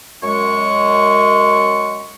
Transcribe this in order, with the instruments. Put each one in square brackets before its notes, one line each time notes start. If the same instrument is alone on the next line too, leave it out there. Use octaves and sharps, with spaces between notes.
[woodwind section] F#2 G#3 C#6